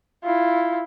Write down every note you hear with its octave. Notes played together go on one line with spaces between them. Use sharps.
E4 F4